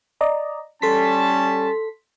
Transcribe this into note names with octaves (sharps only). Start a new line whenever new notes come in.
D5 D#5 A#5
G3 C#4 A4 A5 C6 B6